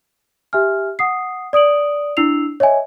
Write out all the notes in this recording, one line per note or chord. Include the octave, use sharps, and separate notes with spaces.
G4 E5 G#5 F6
F#5 D#6 C7
D5 D#6 D7 F#7
D4 E4 E6 C7 F7
C#5 D#5 E5 G#5